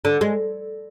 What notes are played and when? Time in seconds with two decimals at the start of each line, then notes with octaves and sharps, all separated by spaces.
0.05 D3
0.21 G#3